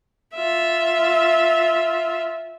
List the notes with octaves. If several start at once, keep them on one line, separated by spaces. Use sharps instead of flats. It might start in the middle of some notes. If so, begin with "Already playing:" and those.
F4 E5